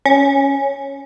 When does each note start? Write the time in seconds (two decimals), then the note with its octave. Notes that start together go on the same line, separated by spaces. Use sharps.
0.06 C#4